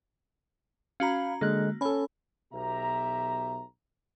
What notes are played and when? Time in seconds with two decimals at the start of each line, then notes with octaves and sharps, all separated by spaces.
1.00 C#4 F#4 F5 A#5 B5
1.41 D3 G#3 A#3 F#6
1.81 C#4 A4 C#5 B5
2.52 B1 B2 G4 E5 A#5